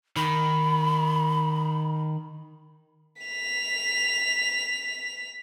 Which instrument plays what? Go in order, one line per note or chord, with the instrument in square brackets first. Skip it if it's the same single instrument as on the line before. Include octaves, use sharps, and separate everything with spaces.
[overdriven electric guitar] D#3 [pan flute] B5
[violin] B6 F7